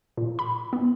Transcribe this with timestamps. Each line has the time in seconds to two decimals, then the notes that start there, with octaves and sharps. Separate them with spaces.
0.17 A#2
0.39 B5
0.73 B3